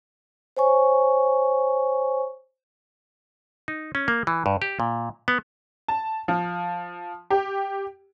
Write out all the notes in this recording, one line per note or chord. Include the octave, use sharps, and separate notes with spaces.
C5 C#5 G#5 C#6
D#4
C#4
A#3
E3
G2
G4
A#2
B3
A5
F3
G4